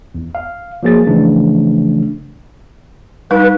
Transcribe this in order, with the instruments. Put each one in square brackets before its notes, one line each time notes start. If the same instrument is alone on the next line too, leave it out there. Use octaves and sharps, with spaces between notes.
[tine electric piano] E2
F5
F3 F#3 A#3 G#4 A6
C#3 E3 F3 A3 D4
[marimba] G3 D#4 [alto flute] B4